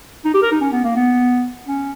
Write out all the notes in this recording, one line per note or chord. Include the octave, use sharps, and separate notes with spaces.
D#4
G4
A#4
D#4
C#4
B3
A#3
B3
C#4